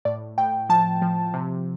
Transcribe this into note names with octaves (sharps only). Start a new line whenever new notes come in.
A2 D5
A2 G5
F3 A5
F3
C3